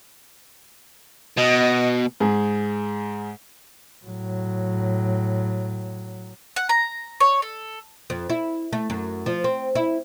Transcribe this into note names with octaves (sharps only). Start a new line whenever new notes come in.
B2 D#5
G#2 G#4
A2 F#3
F#5
A#5
C#5
A4
F2
E4
A3
F#2
F3
C4
E4